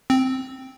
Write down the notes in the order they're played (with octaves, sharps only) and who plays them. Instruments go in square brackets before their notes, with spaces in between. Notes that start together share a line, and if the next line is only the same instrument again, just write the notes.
[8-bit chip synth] C4